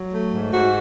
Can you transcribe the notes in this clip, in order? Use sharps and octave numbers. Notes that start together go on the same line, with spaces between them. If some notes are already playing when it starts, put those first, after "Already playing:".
Already playing: F#3
A3
G#2
G#2 F#4